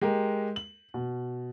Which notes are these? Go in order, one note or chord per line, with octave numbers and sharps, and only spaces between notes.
G#3 G4 A#4
F#7
B2